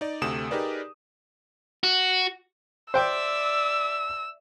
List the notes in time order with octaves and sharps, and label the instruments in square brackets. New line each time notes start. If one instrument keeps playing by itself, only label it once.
[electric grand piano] D#4 D5
D2 C3 A3 D#6 E7
D#4 G4 G#4 A#4 B4 D5
[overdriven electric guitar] F#4
[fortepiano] C5 G5 [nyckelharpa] D5 E5 [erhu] E6